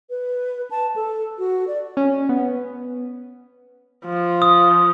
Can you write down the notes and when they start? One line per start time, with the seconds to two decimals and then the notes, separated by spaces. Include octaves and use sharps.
0.10 B4
0.71 A5
0.96 A4
1.39 F#4
1.68 D5
1.97 C#4
2.29 B3
4.06 F3
4.42 D#6